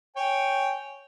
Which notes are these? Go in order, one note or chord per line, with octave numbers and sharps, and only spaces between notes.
C#5 G5 G#5